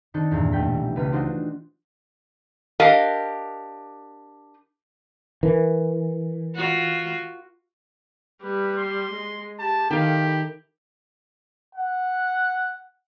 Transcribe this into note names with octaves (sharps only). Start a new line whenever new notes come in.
D#3 C4 D4 D#4 A4
E2 G2 A#2
B1 A#2 G3 A3 G5 B6
E3
C#2 B4 B5 F6
D4 D#4 F4 F#4 C5 D5
D4 G4 A#4 D#5 F5
E3 A#4
F4 F#4
G3 B4
C6
G#3
G4 A5
D#3 E4 G4 A4 F5
F#5